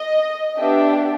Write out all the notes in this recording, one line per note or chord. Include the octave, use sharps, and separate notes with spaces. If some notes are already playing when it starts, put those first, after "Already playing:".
Already playing: D#5
B3 D4 G4 E5